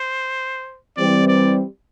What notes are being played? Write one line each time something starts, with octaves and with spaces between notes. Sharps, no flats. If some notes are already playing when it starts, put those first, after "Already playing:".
Already playing: C5
E3 G3 C4 D5
D5